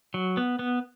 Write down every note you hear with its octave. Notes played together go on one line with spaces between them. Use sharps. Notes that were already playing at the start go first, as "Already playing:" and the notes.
F#3
B3
B3